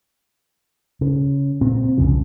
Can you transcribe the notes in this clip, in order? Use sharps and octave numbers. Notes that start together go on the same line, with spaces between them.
C#3
A#2 C4
C2 F2 C#3 F3